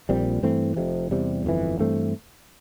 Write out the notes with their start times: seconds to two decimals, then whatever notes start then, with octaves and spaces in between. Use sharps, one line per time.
0.09 A#1 A#2 G3 C4
0.42 G2 E3 A3 C4
0.77 F1 F2 C3
1.11 E2 C3 G3
1.45 G1 F2 E3
1.79 G2 E3 A3 C4